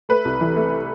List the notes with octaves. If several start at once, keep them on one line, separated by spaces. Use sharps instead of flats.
A3 B4
C2
E3
A3